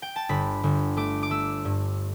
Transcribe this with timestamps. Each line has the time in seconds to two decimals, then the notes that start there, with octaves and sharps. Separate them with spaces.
0.02 G5
0.16 A5
0.29 G1 B5
0.63 G1
0.97 A3 D6
1.23 D6
1.30 A3 E6
1.65 G2